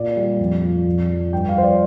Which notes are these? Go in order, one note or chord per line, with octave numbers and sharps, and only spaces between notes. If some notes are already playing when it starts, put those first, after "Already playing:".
Already playing: A#2 D5
G3
F2
F3
F2
F3
G2 G5
F5
F3 C5
D5